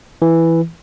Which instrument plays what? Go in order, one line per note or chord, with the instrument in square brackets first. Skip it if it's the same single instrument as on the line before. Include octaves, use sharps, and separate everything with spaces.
[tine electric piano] E3